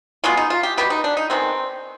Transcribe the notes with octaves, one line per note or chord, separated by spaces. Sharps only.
B2 G#3 B3 F4
D#4
F4
G4
B2 G3 B3 G4
D#4
D4
D#4
D#3 G#3 B3 C4